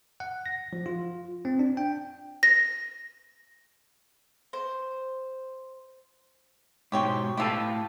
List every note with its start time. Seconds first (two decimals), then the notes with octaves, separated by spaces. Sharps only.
0.20 F#5
0.46 A#6
0.73 F3
0.86 F4
1.45 C4
1.59 D4
1.77 G5
2.43 A#6
4.53 C5
6.92 G#2 B2 G4 C5 C#5 G5
7.37 A2 G4 A4 B4 F5 A5